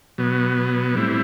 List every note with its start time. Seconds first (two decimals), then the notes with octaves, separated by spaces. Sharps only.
0.18 B2 F#3 B3
0.95 A2 G3 C4 E4